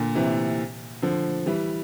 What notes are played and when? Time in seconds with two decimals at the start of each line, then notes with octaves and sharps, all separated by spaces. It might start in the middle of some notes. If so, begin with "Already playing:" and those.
Already playing: A#2 D3
0.15 C3 E3
1.02 D3 F3
1.46 E3 G3